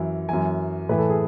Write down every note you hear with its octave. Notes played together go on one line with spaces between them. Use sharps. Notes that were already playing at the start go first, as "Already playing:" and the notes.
Already playing: F#2 E3
F#2 E3 G#5
A2 E3 B4
A4
G#4